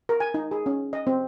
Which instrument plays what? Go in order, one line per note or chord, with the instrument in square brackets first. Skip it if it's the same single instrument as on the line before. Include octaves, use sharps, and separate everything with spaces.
[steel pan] A#4
G#5
D#4
G#4
C#4
D#5
C4